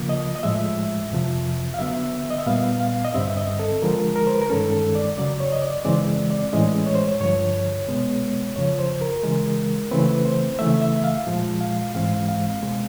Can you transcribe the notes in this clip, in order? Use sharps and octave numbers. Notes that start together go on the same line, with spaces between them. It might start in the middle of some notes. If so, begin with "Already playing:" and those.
Already playing: C#3 F3 A#3
D#5
D#5
A2 F3 G#3 E5
F2 C3 F3
F5
D3 F#3 B3 E5
D#5
E5
A#2 G3 B3 F5
F5
D#5
G2 D3 G3 C4 E5
D#5
A4
D3 F3 G#3 A#4
A#4
C5
B4
A#4
G2 D#3 G#3 C#4 A4
A4
D5
F#2 C#3 F#3 D5
C#5
D#5
D5
F#2 C#3 E3 G#3 C4 D5
D5
A2 E3 G#3 C#4 D#5
C#5
C5
C#5
G2 D3 F3 C#5
B2 G#3 B3
F#2 C#3 F3 C#5
C5
A#4
C#3 E3 G#3
C#3 E3 A3 C4 B4
C5
C#3 E3 A3 E5
E5
F5
A#2 F3 G#3
F5
G#2 E3 G#3 C4 F5
F5
B2 G#3 C4